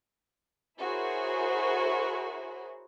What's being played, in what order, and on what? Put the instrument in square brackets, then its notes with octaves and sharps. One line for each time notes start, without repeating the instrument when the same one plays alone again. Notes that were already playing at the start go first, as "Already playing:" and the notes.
[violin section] E4 F#4 G#4 A#4 C5 C#5